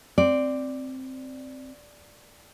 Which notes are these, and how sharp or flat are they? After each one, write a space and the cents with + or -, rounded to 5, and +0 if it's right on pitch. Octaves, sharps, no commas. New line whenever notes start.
C4 +0 D5 +0